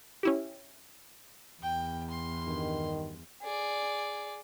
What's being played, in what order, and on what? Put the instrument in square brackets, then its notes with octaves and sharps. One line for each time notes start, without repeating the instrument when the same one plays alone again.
[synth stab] C#4 E4 G4
[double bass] E2 [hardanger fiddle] G5
[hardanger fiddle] C6
[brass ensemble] G2 D#3
[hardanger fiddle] G#4 D5